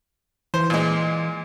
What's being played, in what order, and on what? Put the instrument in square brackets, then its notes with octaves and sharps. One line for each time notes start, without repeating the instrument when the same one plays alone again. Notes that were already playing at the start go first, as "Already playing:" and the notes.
[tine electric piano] E3 [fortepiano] C5
[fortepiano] A#2 G#3